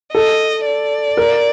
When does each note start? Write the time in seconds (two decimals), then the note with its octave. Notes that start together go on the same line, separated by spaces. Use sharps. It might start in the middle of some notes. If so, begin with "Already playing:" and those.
0.14 A4 D#5
0.66 D5
1.17 A#4